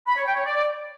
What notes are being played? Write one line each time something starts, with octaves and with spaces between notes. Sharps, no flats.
B5
C#5
G5
C#5
D5